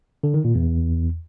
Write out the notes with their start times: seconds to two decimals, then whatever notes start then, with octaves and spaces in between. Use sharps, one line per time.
0.23 D3
0.34 D#3
0.44 A#2
0.55 E2